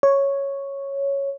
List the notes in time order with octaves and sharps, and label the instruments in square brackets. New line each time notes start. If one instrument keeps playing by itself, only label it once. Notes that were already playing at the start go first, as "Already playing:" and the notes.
[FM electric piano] C#5